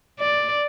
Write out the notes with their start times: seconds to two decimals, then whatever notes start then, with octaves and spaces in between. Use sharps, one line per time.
0.20 D5